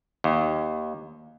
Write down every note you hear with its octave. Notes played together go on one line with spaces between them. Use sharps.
D#2